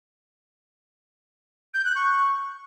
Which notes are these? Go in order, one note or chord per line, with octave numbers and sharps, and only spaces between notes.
G6
F#6
C#6